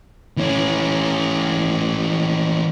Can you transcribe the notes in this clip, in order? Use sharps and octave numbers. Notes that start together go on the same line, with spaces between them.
E3 C#4